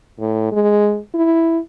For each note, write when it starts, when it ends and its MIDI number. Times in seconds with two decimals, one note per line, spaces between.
0.20 0.49 45
0.52 0.99 56
1.14 1.59 64